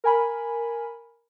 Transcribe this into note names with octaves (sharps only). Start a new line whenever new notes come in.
A#4 G#5 B5